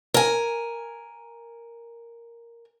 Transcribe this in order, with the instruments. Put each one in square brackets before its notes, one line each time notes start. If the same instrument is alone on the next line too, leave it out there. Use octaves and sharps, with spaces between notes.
[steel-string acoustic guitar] A#4 G#5